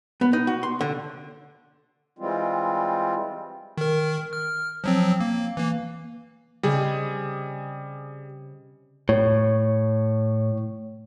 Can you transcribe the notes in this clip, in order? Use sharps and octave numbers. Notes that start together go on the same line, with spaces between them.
B3
D#4
F#4
C6
D3
E3 G3 G#3 C4 F4
D#3 A#4
F6
F3 F#3 C4
A#3
E3 A#3
C#3 G3 C4 G#4 D#5
A2 C#5